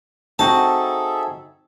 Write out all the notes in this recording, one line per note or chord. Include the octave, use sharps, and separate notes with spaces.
C4 D#4 F#4 G#4 A4 E5 A5